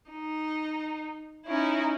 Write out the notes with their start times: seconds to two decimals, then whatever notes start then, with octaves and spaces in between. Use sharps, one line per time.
0.12 D#4
1.46 C#4 D#4 E4